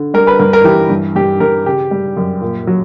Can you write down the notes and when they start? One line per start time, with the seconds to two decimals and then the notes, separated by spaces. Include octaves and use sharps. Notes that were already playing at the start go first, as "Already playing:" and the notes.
Already playing: D3
0.14 G3 A#4
0.27 B4
0.39 G2 A#4
0.53 A#4
0.64 E3 G4
0.90 G2
1.16 G2 G4
1.40 G2 A#4
1.66 C#3 G4
1.91 G3
2.17 F#2
2.41 A#2
2.67 F#3